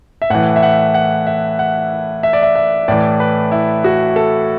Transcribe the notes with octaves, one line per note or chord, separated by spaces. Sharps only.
E5
A2 E3 F#5
E5
F#5
F#5
E5
F#5
E5
D5
E5
E5
A2 E3 D5
B4
E4
F#4
A4